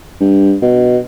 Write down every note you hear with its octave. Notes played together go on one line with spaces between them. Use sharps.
G2
B2